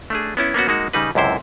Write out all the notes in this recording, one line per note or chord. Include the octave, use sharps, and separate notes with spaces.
A3 D4 G#4
B3 C#4 E4
A#3 B3 C#4 F#4
G#3 A#3 D#4 F#4
C#3 G3 D#4 B4
C#2 F#2 C3 E4 C5